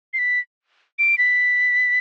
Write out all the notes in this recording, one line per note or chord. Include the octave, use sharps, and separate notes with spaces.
C7
B6
D7
B6